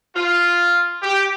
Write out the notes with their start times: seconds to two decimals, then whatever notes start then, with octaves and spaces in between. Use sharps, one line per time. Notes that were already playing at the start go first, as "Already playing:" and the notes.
0.15 F4
1.02 G4